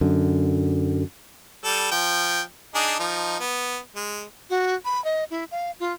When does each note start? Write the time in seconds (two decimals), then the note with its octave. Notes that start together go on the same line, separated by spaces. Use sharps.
0.01 F#2 D3
1.64 G3 A4
1.91 F3 G5
2.75 D4 D#4 G#4
2.99 F3 D#4
3.40 B3
3.96 G#3
4.50 F#4
4.85 B5
5.05 D#5
5.31 E4
5.51 F5
5.80 F4